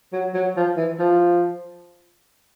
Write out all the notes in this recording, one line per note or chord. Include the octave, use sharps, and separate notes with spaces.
F#3
F#3
F3
E3
F3